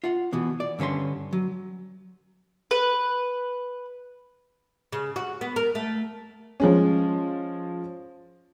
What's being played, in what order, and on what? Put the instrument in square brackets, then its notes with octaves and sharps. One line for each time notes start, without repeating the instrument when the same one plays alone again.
[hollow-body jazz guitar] F4 F#5
B2 E3 B3
D5
G2 D3 C#4 B4 C6
F#3
[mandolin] B4
[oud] C#3
F#4
B3
A#4
A3
[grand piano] F3 G#3 C#4